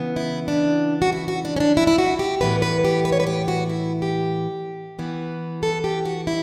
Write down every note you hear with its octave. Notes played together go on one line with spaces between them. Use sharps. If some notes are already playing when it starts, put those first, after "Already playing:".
Already playing: C#3 E3 B3
E4
D4
F#4
E4
F#4
D4
C#4
D4
E4
E4
F#4
G4
A2 E3 B3 B4
B4
G4
B4
C#5
B4
G4
F#4
E4
G4
E3 B3
A4
G4
F#4
E4